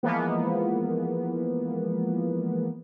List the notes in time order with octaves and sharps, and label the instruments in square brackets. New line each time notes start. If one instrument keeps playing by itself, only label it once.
[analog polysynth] E3 F3 G#3 A#3 B3